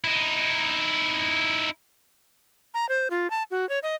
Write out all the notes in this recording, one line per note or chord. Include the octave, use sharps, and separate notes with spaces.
D#4 E4
A#5
C5
F4
A5
F#4
C#5
D#5